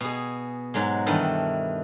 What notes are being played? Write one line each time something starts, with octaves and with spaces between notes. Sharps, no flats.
B2 G#4
G#2 F#3 G#3
G2 D#3 E3 E4 A4